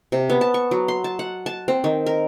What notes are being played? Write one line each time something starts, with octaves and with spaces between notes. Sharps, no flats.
C3
B3
A5
C#6
F#3
C6
A5
F#5
A5
C4
D#3
A#4